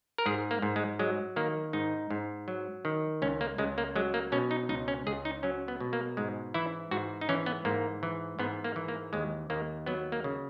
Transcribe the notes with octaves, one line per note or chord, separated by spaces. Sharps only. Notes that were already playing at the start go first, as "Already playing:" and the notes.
A#4
G#2 G#4
A#3
G#2
G#3
F#3 G#3
D#3 A#3
G#2 D#4
G#2
F#3
D#3
C#2 C#4
A#3
C#2 G#3
A#3
F#3 G#3
A#3
B2 C#4
D#4
C#2 D#4
C#4
C#2 G#4
D#4
F#3 C#4
B3
B2
A#3
G#2 G#3
E3 E4
G#2 F#4
D#4
E3 C#4
B3
G#2 A#3
E3
G#2 B3
A#3
E3
A#3
D#2 G#3
D#2 A#3
F#3 B3
A#3
C#3